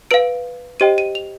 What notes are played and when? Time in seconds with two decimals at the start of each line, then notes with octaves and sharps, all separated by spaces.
0.11 B4 F5 D7
0.80 G4 C5 D#5 G5 D#7
0.98 D#7
1.15 F7